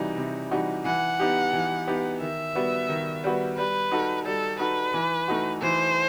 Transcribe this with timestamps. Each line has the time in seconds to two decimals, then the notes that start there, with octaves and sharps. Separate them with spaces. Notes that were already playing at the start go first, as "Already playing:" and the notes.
Already playing: C3 E3 G3 D#4 F#4
0.17 C3
0.51 E3 G3 D#4 F#4
0.85 E3 F#5
1.19 B3 D#4 G4
1.53 E3
1.87 B3 D#4 G4
2.21 D#3 E5
2.55 G3 B3 F#4 B4
2.89 D#3
3.24 G3 B3 F#4 B4
3.57 G3 B4
3.92 D#4 F#4 A4
4.25 G3 A4
4.59 D#4 F#4 A4 B4
4.94 E3
5.28 A3 D#4 F#4
5.61 E3 C5